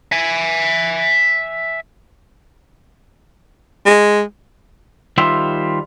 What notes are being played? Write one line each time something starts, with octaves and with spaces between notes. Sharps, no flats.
E5 G#5
G#3
D#3 G3 F4 G4 C5 E5